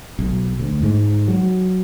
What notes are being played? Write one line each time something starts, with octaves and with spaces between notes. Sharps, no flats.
B1
D2
G#2
F#3